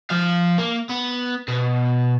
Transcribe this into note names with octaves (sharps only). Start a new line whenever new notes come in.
F3 F5
A#3
B3
B2